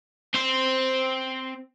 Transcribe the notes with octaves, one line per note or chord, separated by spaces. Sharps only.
C4 C5